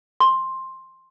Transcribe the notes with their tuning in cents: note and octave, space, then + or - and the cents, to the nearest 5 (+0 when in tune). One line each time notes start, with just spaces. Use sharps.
C6 +10